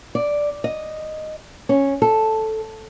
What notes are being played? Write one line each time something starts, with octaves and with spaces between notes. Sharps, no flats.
D5
D#5
C#4
A4